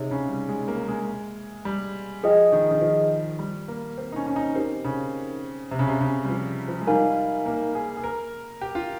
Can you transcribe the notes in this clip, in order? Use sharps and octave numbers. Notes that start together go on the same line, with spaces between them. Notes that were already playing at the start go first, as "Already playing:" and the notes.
Already playing: C3 C4 D#4 G#4 C#5
C#3
G3
G#3
A#3
G#3
G3
F3 G#4 D#5 G5
D#3
D#3
F3
G3
A#3
C4
D#4
C#4
C#4
D#4
C4 D#4 G4 A#4
C#3
C3
C#3
C3
C#3
G3
F3
F3
G#3
G3 D#4 A#4 F5 G#5
A#3
G#4
G#4
A#4
G4
F4